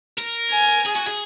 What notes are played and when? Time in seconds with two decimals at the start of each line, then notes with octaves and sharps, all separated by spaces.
0.18 A#4
0.51 G#5
0.86 G#4
0.96 F#4
1.07 G#4